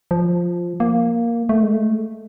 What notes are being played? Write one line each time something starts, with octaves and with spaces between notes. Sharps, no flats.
F3
A#3
A3
G#3
A3